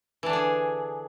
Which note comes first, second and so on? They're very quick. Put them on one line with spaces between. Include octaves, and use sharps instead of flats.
E3 D4 D3 G#4